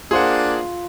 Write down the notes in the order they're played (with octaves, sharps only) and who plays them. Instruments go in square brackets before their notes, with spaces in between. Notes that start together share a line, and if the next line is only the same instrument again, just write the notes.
[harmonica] A#3 D4 [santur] F4 [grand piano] G#4 C5 F#5